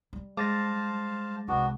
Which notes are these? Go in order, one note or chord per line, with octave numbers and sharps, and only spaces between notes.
G3
G#3 C5 F5 A5 D6 A6 A#6
C2 B3 D4 F#4